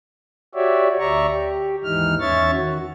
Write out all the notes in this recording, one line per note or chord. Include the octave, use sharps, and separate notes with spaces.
F#4 G4 C#5 D5 E5
D2 D5 E5 A#5 C#6
G4
D#2 G#2 E3 D#4 F6
E2 C#4 C#5 E5 C#6 A6
D#3 F#4